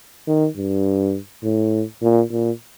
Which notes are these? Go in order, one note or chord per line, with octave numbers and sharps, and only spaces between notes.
D#3
G2
A2
A#2
A#2